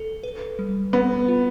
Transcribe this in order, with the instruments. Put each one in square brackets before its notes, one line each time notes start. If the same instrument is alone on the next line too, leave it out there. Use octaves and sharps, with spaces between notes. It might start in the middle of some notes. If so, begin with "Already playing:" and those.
Already playing: [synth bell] A4
B4
G3
[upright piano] B3 [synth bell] C4
[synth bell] F4